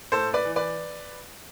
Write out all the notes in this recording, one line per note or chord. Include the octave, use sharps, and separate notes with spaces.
A2 A4 C5
B4 D5
E3
B4 D5